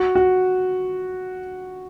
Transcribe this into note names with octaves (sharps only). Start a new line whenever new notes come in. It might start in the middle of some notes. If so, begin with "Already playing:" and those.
Already playing: F#4
F#4